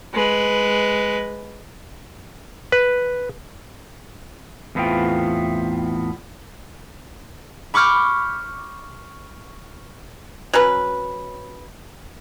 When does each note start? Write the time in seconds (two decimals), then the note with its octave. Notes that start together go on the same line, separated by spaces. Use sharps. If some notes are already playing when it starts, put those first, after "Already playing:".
0.14 G#3 B4
2.72 B4
4.75 E2 A2 B3 C4 F4 G5
7.74 B5 C#6 D6 F6 G6
10.53 F#3 C#4 B4